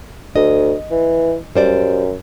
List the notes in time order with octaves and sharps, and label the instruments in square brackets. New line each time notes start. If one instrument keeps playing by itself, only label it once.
[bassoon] D2 [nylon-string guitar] D#5
[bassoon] E3
[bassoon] F#2 [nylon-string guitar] G3 C5 D5